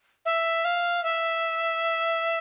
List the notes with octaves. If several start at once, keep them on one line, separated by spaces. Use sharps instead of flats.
E5
F5
E5